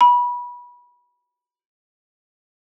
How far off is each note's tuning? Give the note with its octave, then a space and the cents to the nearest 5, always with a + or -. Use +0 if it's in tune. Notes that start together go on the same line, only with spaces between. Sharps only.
B5 -25